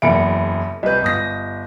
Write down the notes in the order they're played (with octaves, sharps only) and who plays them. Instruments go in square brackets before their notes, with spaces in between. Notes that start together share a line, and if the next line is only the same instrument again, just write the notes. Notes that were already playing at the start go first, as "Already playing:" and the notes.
[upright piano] F#1 E2 D7 [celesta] E5 B5 C#7
[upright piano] C2 B4 [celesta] D#5 G6
[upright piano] G1 D#6 A#6